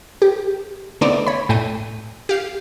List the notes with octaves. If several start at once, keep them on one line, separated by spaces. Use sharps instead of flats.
G4
D3 A3 B3 C4 D#4 D5
C#5 B5
A2 A3 G5 D#7
G4 F5 C7